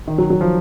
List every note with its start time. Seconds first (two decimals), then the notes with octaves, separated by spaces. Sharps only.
0.08 D#3
0.18 F#3
0.30 F#3
0.41 F3